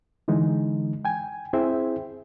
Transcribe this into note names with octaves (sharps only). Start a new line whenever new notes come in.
D3 E3 G#3 D#4
G5 G#5
C4 E4 G#4 C5 E5 G5